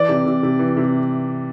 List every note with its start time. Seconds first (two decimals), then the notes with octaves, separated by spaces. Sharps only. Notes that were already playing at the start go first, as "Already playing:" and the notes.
Already playing: E3 D5
0.09 C3
0.26 C3
0.43 C3
0.59 E3
0.77 C3